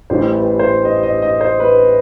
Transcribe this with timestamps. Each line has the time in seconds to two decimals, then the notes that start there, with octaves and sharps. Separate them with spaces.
0.10 A1 A2 E3 G3 C5
0.35 B4
0.59 C5
0.85 D#5
1.03 D#5
1.22 D#5
1.41 C5
1.60 B4